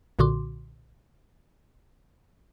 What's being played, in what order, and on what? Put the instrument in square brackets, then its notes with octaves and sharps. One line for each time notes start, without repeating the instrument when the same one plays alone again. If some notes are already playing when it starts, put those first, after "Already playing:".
[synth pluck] B1 A#2 D3 F#4 C6 D6